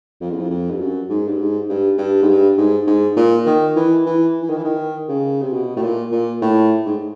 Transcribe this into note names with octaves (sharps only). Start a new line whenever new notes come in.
F2
E2
F2
F2
G2
F#2
G#2
G2
G#2
G2
G2
G#2
G2
G#2
G#2
A#2
D#3
E3
E3
E3
D#3
E3
D#3
C#3
C3
B2
A2
A#2
A#2
A2
G#2